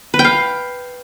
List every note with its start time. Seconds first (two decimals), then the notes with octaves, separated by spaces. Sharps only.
0.14 B4
0.19 G5
0.24 F5